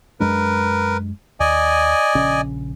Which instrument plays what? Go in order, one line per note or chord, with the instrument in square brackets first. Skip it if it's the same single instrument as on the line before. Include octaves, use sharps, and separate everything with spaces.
[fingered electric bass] F#2 G#3 D4 [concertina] A#4 B4
[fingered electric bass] D#2 [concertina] D5 D#5 G#5
[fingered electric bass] A#1 C#3 C#4